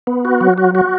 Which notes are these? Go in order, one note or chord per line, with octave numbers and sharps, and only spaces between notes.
B3
F#4
F#3
F#4
F#4